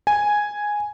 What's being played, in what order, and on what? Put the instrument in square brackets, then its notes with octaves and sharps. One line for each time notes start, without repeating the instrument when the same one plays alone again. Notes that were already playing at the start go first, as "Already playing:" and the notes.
[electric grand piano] G#5